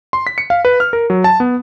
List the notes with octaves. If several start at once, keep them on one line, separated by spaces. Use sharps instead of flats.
C6
B6
C#7
F5
B4
F6
A#4
F#3
A5
B3